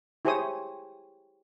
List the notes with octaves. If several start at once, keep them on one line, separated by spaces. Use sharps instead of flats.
E4 G4 G#4 C5 C#5 D#6